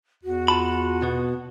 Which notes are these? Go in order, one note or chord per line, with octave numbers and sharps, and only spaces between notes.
E2 F#4
F4 A5 B5
B2 B3